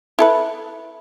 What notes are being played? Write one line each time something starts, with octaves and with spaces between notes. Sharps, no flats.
E4 A4 B4